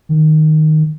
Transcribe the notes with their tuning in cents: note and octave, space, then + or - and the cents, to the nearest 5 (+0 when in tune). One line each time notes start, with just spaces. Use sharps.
D#3 -5